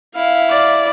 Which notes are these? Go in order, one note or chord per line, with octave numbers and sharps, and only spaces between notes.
E4 F5
D5